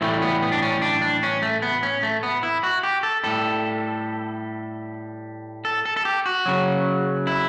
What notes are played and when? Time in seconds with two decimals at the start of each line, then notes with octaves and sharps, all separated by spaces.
0.01 A2 E3 G3 A3
0.22 B3
0.42 B3
0.52 D4
0.62 C#4
0.82 D4
1.02 D4
1.23 C#4
1.42 A3
1.62 B3
1.83 C#4
2.03 A3
2.23 B3
2.43 E4
2.64 F#4
2.83 G4
3.03 A4
3.24 A2 G3 A4
5.65 A4
5.86 A4
5.97 A4
6.05 G4
6.26 F#4
6.46 C#3 F#3
7.27 E4